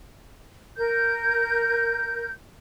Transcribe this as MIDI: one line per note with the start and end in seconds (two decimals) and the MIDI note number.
0.77 2.31 70
0.77 2.31 91